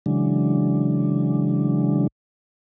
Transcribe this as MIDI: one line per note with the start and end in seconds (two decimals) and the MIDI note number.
0.06 2.07 49
0.06 2.07 52
0.06 2.07 54
0.06 2.07 56
0.06 2.07 62